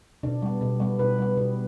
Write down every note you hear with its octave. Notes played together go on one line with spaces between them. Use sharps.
B2 D4
G3 B3
B2
G3 B3
B2 B4
G3 B3
B2